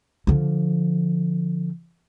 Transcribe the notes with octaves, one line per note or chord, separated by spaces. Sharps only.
D3 F3